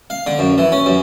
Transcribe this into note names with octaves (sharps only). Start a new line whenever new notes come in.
F5
D3
F#2
E3
C#4
F#2